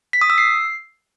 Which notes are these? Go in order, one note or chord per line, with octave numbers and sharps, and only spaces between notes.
B6
D#6
E6
C7